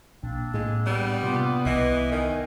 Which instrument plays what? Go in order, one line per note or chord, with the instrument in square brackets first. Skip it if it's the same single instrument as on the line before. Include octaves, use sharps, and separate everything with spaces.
[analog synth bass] B1 [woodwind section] A#3 C4 D4
[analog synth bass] A2 [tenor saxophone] G#3
[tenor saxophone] G3 [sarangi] B3
[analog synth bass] C3 [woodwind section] A#3 F4 D6
[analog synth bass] C2 [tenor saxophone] E3 [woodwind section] D#5
[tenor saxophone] D#3 [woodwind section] G#5